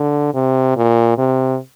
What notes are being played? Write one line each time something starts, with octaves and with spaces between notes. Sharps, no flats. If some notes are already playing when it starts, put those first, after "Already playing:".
Already playing: D3
C3
A#2
C3